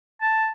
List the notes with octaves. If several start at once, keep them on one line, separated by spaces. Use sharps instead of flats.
A5